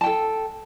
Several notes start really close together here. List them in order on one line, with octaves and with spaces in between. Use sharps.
A5 G5 A4